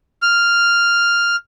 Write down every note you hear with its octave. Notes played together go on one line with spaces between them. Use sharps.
F6